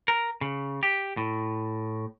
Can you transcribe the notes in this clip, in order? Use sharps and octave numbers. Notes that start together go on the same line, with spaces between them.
A#4
C#3
G4
A2